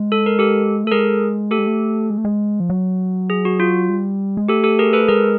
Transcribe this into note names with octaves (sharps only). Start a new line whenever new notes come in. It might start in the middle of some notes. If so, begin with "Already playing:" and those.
Already playing: G#3
A4
A#4
G4 A4
A3
A4
G#3 G#4 A#4
A3 G4 A4
G#3
A3
G#3
A3
G#3
F3
F#3
G#4
F#4
F4
G3
G#3
A3 G4 A4
G4 A4
G#4 A#4
A4 B4
G#3 G#4 A#4